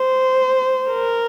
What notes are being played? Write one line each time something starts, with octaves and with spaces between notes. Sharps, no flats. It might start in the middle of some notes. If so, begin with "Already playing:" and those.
Already playing: C5
A#4